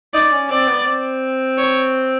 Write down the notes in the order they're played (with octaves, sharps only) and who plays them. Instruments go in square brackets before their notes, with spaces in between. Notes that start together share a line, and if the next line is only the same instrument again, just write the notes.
[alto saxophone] D#4 [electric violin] D5
[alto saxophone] C#4
[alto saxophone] C4 [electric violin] D5
[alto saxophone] B3
C4
[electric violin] C#5